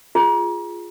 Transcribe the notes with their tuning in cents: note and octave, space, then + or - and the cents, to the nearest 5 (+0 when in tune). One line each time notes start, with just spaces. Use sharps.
F4 +0 G#4 +0